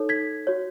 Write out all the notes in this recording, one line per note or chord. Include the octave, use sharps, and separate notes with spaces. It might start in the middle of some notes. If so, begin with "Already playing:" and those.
Already playing: D#4 A4 C#5
G#6 B6
F#4 C#5